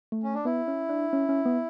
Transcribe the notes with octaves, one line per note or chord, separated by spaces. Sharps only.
A3
C#4
D4
B3 E4
C#4
D4
C#4
C#4
B3